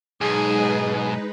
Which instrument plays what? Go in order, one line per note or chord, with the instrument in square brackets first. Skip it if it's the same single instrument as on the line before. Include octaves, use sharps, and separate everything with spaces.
[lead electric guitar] B1 [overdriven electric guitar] G#2 [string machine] G#3 D#4 B4 [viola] G#4